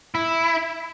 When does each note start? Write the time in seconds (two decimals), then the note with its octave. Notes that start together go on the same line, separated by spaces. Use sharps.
0.15 E4